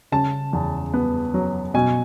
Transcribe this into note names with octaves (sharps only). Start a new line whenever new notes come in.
C#3 A5
E2
B3
F#3
B2 G#5